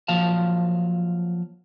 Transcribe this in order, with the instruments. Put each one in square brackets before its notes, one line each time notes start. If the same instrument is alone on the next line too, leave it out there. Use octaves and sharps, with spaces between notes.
[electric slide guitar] F3 F#3 A#3 F5 A5